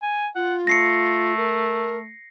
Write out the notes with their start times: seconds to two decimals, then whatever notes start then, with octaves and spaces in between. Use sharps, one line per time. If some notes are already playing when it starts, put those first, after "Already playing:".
0.02 G#5
0.35 F4 F#5
0.67 A3 A#6 C7 C#7
1.37 A#4